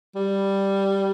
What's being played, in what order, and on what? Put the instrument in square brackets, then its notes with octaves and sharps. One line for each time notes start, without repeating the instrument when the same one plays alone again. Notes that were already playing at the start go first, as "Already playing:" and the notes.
[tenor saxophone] G3